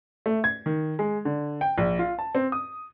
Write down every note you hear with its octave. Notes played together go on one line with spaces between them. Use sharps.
A3
G#6
D#3
G#3
D3
G5
A#1
F4
A5
C4
D#6